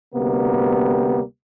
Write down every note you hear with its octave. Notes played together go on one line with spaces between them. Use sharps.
D2 C3 G3 A#3 B3